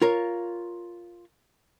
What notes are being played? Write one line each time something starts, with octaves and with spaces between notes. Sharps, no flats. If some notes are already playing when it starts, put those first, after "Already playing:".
F4 A#4 C#5